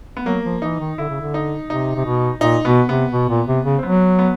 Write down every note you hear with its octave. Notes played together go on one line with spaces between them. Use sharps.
B3
F#3 A#3
F3
E3 D#4
D#3
D3 E4
C#3
D3
D#4
C3 D#4
C3
B2
A#2 D#4
B2 B3
C3 B3
B2
A#2
C3
C#3
C4
F#3 B3
B3